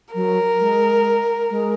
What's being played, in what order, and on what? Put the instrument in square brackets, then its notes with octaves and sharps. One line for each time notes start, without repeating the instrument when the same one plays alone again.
[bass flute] F#3 [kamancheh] A#4
[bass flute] G#3
G#3